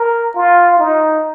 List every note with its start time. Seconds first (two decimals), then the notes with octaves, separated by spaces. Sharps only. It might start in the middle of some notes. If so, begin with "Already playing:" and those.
Already playing: A#4
0.35 F4
0.79 D#4